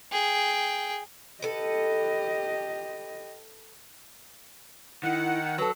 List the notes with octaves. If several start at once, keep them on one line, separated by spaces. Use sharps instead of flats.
G#4 G5
G4 A4 B4 D#5
D#3 E4 F#5
F#3 A4 B4